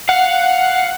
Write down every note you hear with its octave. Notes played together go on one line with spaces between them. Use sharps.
F5 F#5